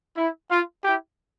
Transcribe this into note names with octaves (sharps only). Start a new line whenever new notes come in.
E4
F4
E4 G4